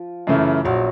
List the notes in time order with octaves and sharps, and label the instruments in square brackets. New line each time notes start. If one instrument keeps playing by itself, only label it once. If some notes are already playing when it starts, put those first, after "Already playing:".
Already playing: [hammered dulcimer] F3
[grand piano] F#2 C#3 E3 A3
[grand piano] A#1 [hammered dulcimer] F#3